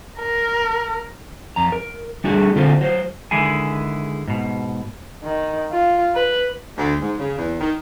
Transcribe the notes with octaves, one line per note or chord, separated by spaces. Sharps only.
A#4
F2 A#5
A#4
G3 A3 D4 F#4 G#4
D3 C4 F4 A4 C5
F#3 C5
D3 D#3 G#3 E4 G#4 G#5
G#2 B2
D#3
F4
B4
D2
G#2
C#3
E2
D#3